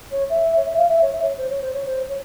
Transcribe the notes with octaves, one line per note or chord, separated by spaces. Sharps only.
C#5
E5
C#5
E5
F5
E5
C#5
E5
C#5
C5
C#5
C5
C#5
C5
C#5